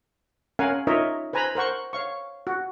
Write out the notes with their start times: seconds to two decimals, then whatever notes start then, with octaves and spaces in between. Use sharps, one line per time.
0.59 C#4 A#4 F5 F#5 G#5
0.87 D#4 F4 A#4 C#5 D#5 E5
1.33 B4 C5 G#5 A#5 B5
1.55 A#4 C5 F#5 C#6
1.93 C#5 F5 C#6
2.47 F#4